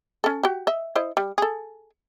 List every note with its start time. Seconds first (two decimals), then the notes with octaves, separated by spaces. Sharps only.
0.24 C#4 A4
0.43 F#4 G4
0.67 D#5 E5
0.95 E4 C5 D#5
1.17 G3
1.38 G#4 A4